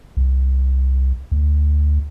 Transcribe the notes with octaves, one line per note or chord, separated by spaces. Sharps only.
C2
D2